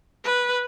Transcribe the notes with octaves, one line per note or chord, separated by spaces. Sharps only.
B4